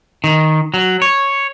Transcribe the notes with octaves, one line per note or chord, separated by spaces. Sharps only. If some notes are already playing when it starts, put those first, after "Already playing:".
D#3
F#3
C#5